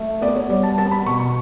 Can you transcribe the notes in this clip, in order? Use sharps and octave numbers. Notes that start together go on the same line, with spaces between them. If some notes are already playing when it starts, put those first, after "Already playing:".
Already playing: A3
B3 D5
C#5
G3 D5
A5
B3 A5
B5
B2 C#6
C#6